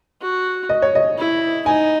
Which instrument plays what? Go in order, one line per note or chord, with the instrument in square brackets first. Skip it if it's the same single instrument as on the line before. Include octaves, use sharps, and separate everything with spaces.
[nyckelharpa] F#4
[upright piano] D#5
C#5
D#5
[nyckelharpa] E4
[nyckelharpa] D#4 [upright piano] G#5